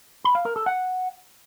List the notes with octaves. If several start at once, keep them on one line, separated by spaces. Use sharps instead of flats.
B5
F5
A#4
A4
F#5